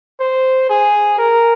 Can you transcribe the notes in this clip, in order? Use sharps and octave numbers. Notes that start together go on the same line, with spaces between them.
C5
G#4
A#4